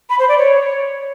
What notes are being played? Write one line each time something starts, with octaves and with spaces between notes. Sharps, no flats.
B5
C5
D5
C#5